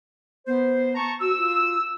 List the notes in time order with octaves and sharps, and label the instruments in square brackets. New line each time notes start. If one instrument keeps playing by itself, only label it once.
[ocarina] B3 [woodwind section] C5
[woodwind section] A5 A#5 C#6
[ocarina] F#4 [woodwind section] E6
[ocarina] F4